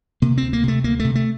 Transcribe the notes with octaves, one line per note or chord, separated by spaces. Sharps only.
C3 A#3
C4
D2
A#3
C3 A3
D2 A#3
C3 A3
A3